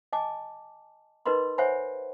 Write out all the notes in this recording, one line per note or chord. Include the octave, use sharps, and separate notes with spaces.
D#5 G#5 A5 D6
D#4 A#4 B4 D#5 B5 C6
C5 C#5 E5 F#5 G#5 B5